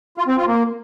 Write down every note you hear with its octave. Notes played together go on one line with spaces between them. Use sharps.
F4
C4
F4
A#3